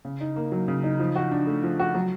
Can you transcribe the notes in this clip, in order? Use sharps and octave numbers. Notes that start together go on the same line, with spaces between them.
C#3
D#4
A#3
F#3
C#3
D#4
F3
F#4
D4
A3
F3
F#4
F#3